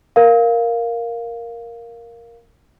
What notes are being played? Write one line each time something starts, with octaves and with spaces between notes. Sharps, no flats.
A#4 F5